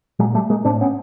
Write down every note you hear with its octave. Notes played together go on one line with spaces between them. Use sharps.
A#2 F#3 G#3
G3 A3
G#3 A#3
A2 C4 D4
B3 C#4